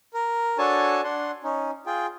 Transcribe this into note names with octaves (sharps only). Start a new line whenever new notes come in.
A#4
D4 F#4 A4 C#5 G#5 A5
D4 F#5 C6
C#4 D#4
F4 G#4 G5